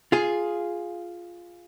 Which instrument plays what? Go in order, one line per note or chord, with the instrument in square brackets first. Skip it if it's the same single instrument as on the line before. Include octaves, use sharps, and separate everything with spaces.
[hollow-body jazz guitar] F4 G#4